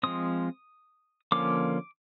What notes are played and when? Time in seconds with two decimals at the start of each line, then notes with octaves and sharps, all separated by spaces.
0.03 F3 G#3 C4 D#6
1.32 D3 F3 A#3 C#4 D6